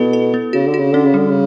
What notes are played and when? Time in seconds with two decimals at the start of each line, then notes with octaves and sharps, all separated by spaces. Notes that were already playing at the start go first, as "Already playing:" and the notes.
Already playing: B2 B3 E4 A4
0.13 A4
0.34 B3
0.53 C#3 F#4
0.67 D3
0.74 F#4
0.79 C#3
0.92 D3 C#4
1.05 C#3
1.14 D3 G3
1.30 C#3